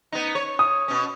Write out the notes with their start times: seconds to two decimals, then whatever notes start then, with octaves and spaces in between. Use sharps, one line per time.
0.12 B3 D#4
0.35 C#5
0.59 D#6
0.88 B2 C#4